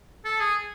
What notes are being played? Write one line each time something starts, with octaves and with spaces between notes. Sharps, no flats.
A4
G#4